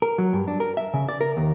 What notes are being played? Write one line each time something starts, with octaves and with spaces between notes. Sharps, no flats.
A#4
F#3
G2
D4
A#4
E5
C#3
D5
A#4
D#2